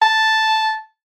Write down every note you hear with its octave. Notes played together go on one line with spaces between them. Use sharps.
A5